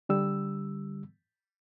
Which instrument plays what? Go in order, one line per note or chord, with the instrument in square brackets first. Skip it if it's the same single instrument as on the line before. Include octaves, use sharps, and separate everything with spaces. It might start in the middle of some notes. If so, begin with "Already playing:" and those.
[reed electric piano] D3 G3 E6